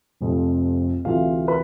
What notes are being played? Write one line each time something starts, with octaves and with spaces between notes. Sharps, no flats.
F1 F2 C3 F3
D2 C3 E3 F4 F5
B4 B5